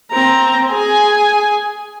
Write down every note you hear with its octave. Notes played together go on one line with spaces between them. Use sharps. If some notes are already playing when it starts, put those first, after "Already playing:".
C4 A#5
G#4 G#5